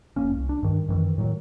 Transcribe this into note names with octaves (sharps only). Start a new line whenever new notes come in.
F1 A#3 C#4
C2
D4
G2 D#3
F#2 D#3 E3
A2 D#3 F#3